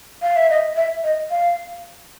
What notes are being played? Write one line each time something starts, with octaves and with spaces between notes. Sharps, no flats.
F5
E5
D#5
E5
D#5
F5